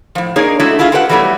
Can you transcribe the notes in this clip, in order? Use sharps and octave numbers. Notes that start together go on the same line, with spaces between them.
A2 F3
A#3 D4 D#4 G#4 C#5
G#3 A3 D4 E4 F#4 A4
A3 E4 F4 G#4 F5
F4 G4 A4 B4 D5 F#5
E3 F#3 G3 A3 B3 E4